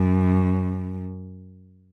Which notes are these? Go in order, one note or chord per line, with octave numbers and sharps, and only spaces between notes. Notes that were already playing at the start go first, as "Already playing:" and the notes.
Already playing: F#2